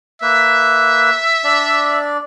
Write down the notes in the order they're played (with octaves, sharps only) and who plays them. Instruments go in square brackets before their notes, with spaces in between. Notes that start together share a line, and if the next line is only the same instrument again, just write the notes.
[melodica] A#3 B4 [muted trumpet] E5
[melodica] D4 D5